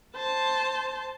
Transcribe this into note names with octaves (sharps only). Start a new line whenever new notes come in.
C5 A5